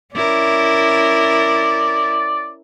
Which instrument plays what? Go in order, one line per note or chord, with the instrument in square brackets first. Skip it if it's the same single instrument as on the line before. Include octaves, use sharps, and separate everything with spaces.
[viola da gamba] C#4 E4 A#4 [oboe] D5